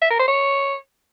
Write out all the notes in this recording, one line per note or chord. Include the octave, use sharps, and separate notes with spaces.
E5
A#4
C5
C#5